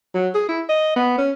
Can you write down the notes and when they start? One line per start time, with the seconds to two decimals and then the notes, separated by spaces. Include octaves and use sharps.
0.14 F#3
0.34 G#4
0.48 E4
0.69 D#5
0.96 B3
1.18 C#4